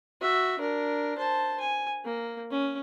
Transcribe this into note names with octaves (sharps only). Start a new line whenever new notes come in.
F#4 E5
D4 A#4
C5 A5
G#5
A#3
C#4